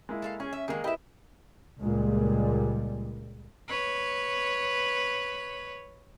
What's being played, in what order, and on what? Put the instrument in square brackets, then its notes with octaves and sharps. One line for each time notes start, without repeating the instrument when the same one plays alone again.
[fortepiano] G#3 A#3 E4
[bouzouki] A4 B4 F5
[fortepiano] C#4 [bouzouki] G#4
[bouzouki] E5
[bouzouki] D#3 G#3 [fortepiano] A#3 G#4
[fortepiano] E4 B4 D#5 [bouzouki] G4 E5
[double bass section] C#2 A#2 G3 G#3
[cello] B4 C#5